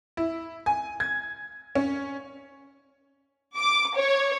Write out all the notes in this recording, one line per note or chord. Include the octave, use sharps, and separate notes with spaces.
E4
G#5
G#6
C#4
D6
C#5